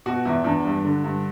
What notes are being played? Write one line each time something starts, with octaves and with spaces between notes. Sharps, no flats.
B2 F#4
E2 E4
E2 D4
G2
D3
G2